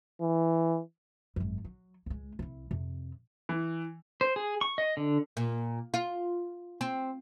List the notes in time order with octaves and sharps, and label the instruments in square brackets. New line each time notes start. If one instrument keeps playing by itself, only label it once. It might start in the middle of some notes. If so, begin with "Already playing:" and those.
[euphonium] E3
[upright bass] G#1 F#2
F#3
C#2 G#3
C2 E4
F2 C3
[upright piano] E3
[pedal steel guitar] C5
G#4
C#6
D#5
D3
[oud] A#2
F4
C4